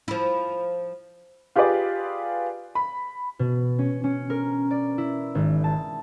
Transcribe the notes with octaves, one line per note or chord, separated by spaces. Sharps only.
F3 E4
F4 G4 G#4 B4 D5 F5
B5
B2
C#4
C#4
A#4
D5
E4
G#1
A5